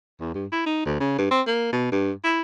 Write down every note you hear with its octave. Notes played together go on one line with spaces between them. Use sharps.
E2
G2
E4
D#4
D2
C#3
G2
C4
A#3
B2
G2
E4